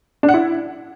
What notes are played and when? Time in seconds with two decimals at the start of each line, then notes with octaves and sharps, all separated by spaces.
0.23 D4
0.29 F#5
0.34 E4